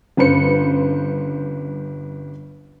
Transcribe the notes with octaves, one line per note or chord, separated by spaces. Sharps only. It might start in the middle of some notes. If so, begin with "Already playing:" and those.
G1 G2 C#3 B4 C5 C#7